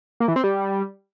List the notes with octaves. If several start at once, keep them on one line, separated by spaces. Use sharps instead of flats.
A#3
E3
C4
G3